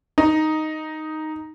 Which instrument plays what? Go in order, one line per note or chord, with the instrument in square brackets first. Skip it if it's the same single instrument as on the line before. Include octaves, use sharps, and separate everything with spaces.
[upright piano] D#4